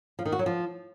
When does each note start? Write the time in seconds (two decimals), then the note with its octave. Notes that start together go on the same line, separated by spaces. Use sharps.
0.19 F3
0.25 D#3
0.32 F#4
0.39 F#3
0.46 F3